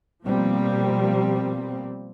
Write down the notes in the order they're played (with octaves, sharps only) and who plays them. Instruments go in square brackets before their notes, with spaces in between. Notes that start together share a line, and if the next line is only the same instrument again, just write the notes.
[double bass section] B2 F3 G3 A#3 C4